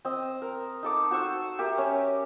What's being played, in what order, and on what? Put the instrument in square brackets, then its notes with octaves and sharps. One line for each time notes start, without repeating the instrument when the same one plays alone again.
[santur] C4 D#5
A#4
D#4 A4 D6
F#4 C5 C#6 E6
G4 A#4 E5
C#4